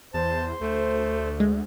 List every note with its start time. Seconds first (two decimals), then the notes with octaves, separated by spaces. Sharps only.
0.14 E2 C5 A5
0.61 D2 A3
1.40 G#3